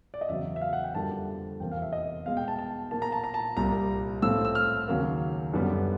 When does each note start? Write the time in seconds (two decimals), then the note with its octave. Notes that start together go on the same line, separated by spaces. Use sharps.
0.14 D5
0.21 D#5
0.29 E2 C#3 F#3 B3 E5
0.56 E5
0.61 F5
0.73 F#5
0.84 G5
0.95 F2 D3 G3 A#3 A5
1.60 E2 C3 F3 A#3 G5
1.72 F5
1.82 E5
1.93 D#5
2.26 B2 G#3 B3 F5
2.37 G5
2.48 A5
2.59 A5
2.91 A#2 F3 A#3 A5
3.02 A#5
3.12 A5
3.24 A#5
3.34 A5
3.57 C2 A#2 G3 A#5
4.22 A2 F3 A3 C4 E6
4.45 E6
4.55 F6
4.88 D#2 C#3 F#3 A#3
5.54 F#2 D3 G3 B3